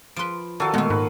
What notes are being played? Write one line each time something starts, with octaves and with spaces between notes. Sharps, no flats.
F3 B4 C6 D7
D#3 F#3 A4 F5 G#5
A#2 D#3 G#3 A3 B3
G#2 B4